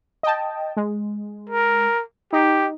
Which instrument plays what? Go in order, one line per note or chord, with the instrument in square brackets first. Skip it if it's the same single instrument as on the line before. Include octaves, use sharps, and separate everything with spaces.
[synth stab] D#5 G5 A5
G#3
[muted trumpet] A#4
[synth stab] D#4 [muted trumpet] G4